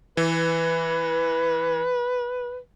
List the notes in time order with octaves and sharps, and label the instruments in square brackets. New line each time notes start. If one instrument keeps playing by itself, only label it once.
[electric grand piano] E3 [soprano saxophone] B4